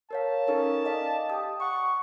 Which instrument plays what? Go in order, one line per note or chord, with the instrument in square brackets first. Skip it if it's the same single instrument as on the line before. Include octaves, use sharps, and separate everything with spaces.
[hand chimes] A#4 C#5 F5 [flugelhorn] A5
[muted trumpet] C#4 [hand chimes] D#4 A4 A#4
[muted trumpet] D5 [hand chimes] D#5 F5
[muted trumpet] G4 [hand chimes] D#6
[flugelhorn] F#5 [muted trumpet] C#6